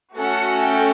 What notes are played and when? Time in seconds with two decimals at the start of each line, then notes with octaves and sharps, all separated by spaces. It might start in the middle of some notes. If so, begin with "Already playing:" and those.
0.18 A3 C#4 F#4 A4 F#5
0.62 G5